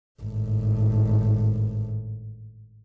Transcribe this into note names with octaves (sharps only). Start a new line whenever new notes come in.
G#1 A2